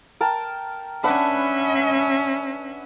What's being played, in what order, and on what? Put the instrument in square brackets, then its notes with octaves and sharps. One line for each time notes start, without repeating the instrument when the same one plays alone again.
[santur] A#4 G5 A5
[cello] C#4 E5 [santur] D4 B4 F#5